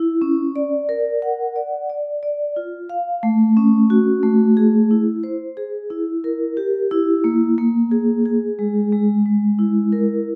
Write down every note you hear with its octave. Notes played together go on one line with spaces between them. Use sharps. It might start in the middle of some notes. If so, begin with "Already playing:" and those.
Already playing: E4
C#4
D5
A#4
F#5
D5
D5
D5
F4
F5
A3
C#4
F#4
A3
G#4
E4
C5
G#4
E4
A#4
G4
E4
A#3
A#3
G#4
G#4
G#3
G#3
G#3
E4
A#4